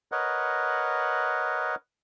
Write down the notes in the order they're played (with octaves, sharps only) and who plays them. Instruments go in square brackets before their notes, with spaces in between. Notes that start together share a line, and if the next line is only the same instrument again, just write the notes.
[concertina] A#4 B4 C#5 D#5 F#5